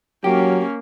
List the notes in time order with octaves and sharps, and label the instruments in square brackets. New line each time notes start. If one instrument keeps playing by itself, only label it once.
[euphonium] F#3 [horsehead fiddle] A#3 C#4 [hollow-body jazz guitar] G4